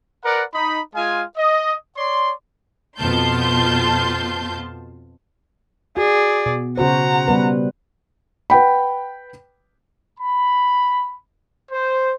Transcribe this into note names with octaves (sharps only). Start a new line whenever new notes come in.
A#4 B4 D5 F#5 A#5
D#4 B5
G#3 F4 F5 G#5
D#5
C#5 D5 C6
F2 B2 F4 A5 C6 G6
F#4 G#4 D5
B2
C#3 F#4 C5 F#5 A#5
G3 B3 B4
B4 F#5 G5 B5
B5
C5